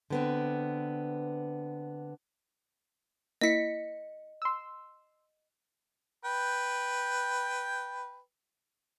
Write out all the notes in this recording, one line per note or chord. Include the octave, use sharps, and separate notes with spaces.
D3 B3 C4
A#3 E4 D#5 B6 C#7
C6 E6
B4 G5